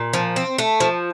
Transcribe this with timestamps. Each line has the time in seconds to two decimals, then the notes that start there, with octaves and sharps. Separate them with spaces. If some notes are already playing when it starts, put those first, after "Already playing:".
Already playing: A#2
0.13 F3
0.36 C4
0.58 A3
0.80 F3